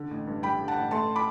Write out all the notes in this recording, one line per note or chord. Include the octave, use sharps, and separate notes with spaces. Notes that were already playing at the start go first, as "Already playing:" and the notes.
Already playing: D3
A1
G2
G3 G5 B5
D3
F#5 A5
A1
A3 A5 C6
B5 D6